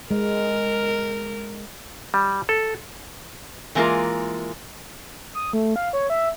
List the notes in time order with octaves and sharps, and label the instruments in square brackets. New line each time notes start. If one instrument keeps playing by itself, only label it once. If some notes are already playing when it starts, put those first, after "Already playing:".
[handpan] G#3 [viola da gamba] A#4
[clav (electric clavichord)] G3
A4
[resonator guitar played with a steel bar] E3 G#3 A#3 D#4 F4 A#4
[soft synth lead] D#6
A3
F5
C#5
E5